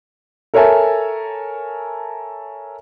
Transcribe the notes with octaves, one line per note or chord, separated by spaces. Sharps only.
A4 A#4 C#5 E5 G#5 A5